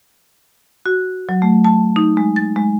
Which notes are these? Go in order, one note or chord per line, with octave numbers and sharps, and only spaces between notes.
F#4
F#3
A3
A5
D#4
G#3
A6
G#3